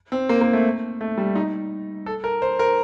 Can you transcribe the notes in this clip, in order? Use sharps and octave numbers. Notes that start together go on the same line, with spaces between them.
C4
A#3
A#3
A3
A3
G3
D#4
A4
A#4
C5
A#4